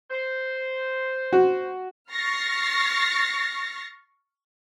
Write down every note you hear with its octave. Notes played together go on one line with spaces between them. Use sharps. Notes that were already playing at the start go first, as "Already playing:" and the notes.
C5
F#4
C#6 F6 A6 A#6 C7